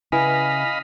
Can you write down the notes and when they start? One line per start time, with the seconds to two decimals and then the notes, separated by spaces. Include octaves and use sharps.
0.12 C#3 E4 B4 D#5 F5 G#5 B5